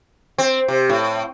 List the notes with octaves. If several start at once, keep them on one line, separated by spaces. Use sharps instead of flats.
C4
C3
A2